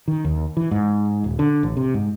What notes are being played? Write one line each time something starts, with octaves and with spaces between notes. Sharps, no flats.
D#3
D#2
E3
G#2
D#1
D3
A1
C3
G#2